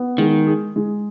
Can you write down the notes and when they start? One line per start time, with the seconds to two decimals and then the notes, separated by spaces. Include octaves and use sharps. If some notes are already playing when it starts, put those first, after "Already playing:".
Already playing: B3
0.18 D#3 G#3
0.47 G#4
0.76 G#3